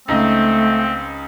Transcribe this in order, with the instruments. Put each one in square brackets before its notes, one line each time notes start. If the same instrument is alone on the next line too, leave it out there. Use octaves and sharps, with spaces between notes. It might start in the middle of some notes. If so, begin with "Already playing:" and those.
[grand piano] C#2 D#4 D#5 [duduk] A3 [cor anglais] C4